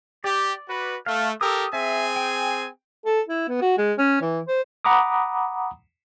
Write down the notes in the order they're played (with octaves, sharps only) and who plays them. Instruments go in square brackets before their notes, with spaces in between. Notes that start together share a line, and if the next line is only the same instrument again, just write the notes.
[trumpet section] G4 [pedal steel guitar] D5
[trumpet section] F#4 B4
[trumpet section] A3 [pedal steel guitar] F5
[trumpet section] G4 A4 A#4 [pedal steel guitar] D#6 E6
[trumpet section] C4 G#4 G#5 [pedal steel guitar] E5
[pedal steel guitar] G5
[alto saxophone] A4
E4
B3
F#4
G#3
C#4
E3
C5
[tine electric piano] F#5 A#5 B5 D6 D#6